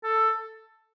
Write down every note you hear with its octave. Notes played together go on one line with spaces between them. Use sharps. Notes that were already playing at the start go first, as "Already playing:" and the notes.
A4